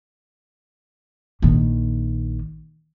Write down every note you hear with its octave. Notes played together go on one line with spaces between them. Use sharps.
A#1 D#3